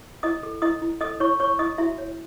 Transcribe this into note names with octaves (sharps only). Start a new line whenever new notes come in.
E4 D#5 D#6
A4
E4 D#5 D#6
E4
A4 D#5 D#6
E4 C#5 C#6
C#5 C#6
E4 D#5 D#6
E4 F#4 E5
C#5